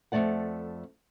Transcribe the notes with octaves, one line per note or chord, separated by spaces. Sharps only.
F2 D#3 A3 D5 F#5